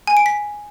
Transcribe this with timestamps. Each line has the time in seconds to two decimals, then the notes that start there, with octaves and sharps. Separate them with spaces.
0.07 G#5
0.17 D7
0.26 B6